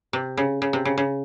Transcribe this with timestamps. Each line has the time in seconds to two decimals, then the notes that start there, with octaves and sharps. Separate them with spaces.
0.13 C3
0.37 C#3
0.62 C#3
0.73 C3
0.85 C#3
0.98 C#3